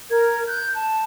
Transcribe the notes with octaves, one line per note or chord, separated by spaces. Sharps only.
A#4 G#6
F#6 G6
A5